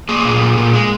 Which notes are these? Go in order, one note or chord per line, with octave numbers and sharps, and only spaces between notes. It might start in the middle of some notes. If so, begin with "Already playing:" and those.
A#3 G#4
A#2
A#2
A#2
G#3